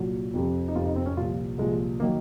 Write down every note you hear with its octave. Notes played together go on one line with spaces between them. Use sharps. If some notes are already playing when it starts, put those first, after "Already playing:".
Already playing: C2 A#2 F#3
F2 C3 F3
D#4
F2 C3 F3 F4
D#4
C4
C#4
C2 A#2 F3 F4
C2 A#2 F3 G#3
D#3 F#3 A#3